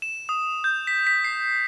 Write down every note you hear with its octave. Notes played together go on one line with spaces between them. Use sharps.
E7
D#6
G6
B6
B6
C7